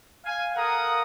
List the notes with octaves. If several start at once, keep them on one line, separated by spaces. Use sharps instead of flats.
F5 G#5
A4 A#4 F5 F#5 A#5 D#6